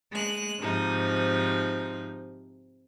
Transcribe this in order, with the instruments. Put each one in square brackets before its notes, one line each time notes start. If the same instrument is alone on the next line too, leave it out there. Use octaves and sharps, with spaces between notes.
[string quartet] G#3 F#6
G#2 C3 F3 D#4